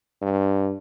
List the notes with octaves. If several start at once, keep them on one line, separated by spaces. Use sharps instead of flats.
G2